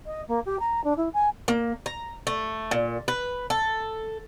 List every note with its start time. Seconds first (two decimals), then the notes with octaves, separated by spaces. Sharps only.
0.06 D#5
0.28 A#3
0.46 G4
0.60 A#5
0.84 D4
0.97 E4
1.13 G#5
1.48 A#3
1.86 A#5
2.27 A3
2.71 A#2
3.08 B4
3.50 A4